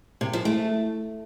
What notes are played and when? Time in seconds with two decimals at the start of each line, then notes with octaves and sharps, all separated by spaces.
0.21 C3
0.33 F3
0.45 A3